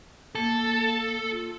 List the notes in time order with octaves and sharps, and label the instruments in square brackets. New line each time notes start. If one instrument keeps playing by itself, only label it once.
[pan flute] A#3 [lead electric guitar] A4
[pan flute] F4